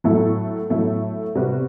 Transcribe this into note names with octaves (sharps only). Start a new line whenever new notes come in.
A2 F#3 A3 E4 A4
A2 F#3 A3 E4 A4
C3 G3 B3 F#4